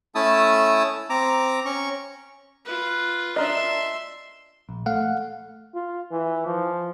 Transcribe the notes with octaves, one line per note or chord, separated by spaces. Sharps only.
A3 C#4 E4 A5 D#6 E6
C4 A#5 D6
C#4 C#6
F4 B4
D4 A#4 D#5 E5 C6
A#1
A3 F5 F#5
F4
E3
F3